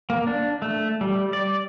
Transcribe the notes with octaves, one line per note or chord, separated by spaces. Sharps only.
A#3
D4
A3
G3
D5